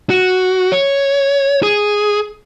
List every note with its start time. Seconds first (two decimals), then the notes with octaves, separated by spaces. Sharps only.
0.10 F#4
0.72 C#5
1.63 G#4